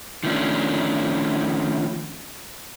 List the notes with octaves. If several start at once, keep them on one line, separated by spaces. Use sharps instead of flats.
D#3 F3 A3 C#4 D4